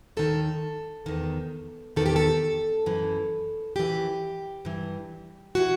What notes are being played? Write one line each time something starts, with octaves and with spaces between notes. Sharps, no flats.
D#2 D#3 A4
E2 D#3
E2 D#3 A4
G4
A4
F#2 E3
F#2 E3 G4
G2 E3
E3 F#4